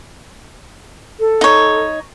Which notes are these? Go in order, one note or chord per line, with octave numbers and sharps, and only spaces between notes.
A4
D#4 C#5